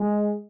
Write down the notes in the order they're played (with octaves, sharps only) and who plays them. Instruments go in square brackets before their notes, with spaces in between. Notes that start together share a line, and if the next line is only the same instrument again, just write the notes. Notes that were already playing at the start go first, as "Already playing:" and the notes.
Already playing: [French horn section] G#3